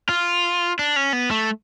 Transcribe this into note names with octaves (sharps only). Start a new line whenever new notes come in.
F4
D4
C#4
B3
A3